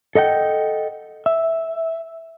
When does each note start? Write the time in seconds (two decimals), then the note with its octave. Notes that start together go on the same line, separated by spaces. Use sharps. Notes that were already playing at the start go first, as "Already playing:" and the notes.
0.15 A4 D#5 F#5 G5
1.26 E5